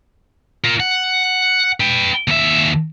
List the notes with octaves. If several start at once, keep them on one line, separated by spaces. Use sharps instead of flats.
F4 A#4
F#5
B4 G5
D#2 E5